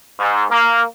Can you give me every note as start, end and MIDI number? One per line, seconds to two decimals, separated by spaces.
0.19 0.45 44
0.49 0.82 58